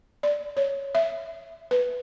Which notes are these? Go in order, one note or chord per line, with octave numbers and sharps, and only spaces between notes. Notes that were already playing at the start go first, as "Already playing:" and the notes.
D5
C#5
E5
B4